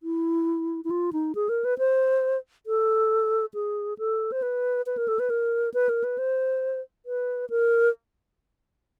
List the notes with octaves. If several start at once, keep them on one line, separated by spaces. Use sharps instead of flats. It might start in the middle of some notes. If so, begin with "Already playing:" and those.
E4
E4
F4
D#4
G#4
A#4
B4
C5
A4
G#4
A4
C5
B4
B4
A#4
A4
B4
A#4
B4
A#4
B4
C5
B4
A#4